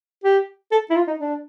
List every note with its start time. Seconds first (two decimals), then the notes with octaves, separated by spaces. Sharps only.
0.24 G4
0.71 A4
0.90 E4
0.96 F4
1.07 D#4
1.19 D4